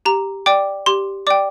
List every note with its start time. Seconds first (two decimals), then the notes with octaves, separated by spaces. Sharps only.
0.05 G4 A#5
0.46 D5 G5 D6
0.86 G4 C6
1.27 D5 G5 D6